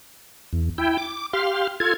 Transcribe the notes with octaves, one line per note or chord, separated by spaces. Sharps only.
E2
E4 G5
D6
G4 F5 C6 F6
F4 A4 G#6